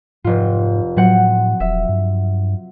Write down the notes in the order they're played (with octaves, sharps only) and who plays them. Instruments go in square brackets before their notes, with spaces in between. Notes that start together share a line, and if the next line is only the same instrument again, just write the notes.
[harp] F1 F4 [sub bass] G#2
[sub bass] A2 [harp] F#3 C4 F#5
[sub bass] D#1 [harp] E5
[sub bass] G2